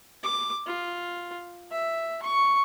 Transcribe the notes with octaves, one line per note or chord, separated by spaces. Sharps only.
D6
F4
E5
C#6